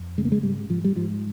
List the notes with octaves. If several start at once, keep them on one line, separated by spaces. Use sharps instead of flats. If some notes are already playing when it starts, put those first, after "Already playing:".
Already playing: F2
C#3 G#3
A#3
G#3
G#2 G3
G#2 F3
G3
G#2 F3